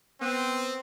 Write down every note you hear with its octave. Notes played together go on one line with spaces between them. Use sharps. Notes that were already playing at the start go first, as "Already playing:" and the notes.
B3 C4